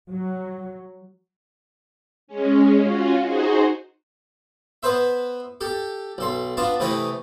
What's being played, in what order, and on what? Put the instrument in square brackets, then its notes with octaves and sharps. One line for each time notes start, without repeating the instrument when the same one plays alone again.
[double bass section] F#3
[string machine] G#3 C#4
C#4 F4 F#4
D#4 F#4 G#4 C5
[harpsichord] B3 B4 C5 E5
G4 A4
B1 A4 C6
B3 D4 F4 F5 A5
C3 E3 A3 B4 D#5 G5